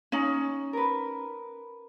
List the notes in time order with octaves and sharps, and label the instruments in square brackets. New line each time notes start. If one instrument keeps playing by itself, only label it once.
[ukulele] C#4 D#4
[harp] A#4 B4